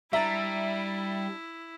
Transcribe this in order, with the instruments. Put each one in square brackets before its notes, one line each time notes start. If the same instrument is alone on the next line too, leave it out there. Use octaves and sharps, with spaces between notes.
[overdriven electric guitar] G3 [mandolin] D4 A#5 [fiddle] E4 [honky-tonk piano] E5